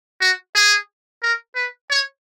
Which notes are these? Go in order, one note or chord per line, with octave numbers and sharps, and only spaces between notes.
F#4
G#4
A#4
B4
C#5